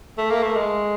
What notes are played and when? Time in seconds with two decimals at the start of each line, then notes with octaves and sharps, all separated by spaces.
0.18 A3
0.30 A#3
0.43 A3
0.56 G#3